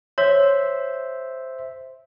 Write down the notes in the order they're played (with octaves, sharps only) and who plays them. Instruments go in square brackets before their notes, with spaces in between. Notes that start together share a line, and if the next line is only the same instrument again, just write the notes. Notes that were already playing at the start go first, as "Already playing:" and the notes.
[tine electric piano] C5 E5 [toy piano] C#5